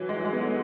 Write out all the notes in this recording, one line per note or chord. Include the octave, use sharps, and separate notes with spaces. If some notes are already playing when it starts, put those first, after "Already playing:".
Already playing: E3 F#3
G#3
F#3
G#3
B3
A3